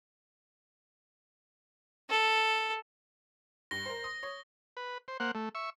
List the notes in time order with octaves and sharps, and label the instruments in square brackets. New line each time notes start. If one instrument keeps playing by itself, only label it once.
[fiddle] A4
[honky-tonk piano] G2 [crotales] A#6 G7
[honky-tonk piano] A#4 C5
D#6
C#5
[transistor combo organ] B4
C5
A#3 C5 F#5
A3
E5 C#6